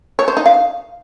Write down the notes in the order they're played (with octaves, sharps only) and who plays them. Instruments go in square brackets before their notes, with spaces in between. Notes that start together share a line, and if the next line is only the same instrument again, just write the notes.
[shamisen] C#5
C5
D#4
F5